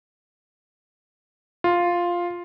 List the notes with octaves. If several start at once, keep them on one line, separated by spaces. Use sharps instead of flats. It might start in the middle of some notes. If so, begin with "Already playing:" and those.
F4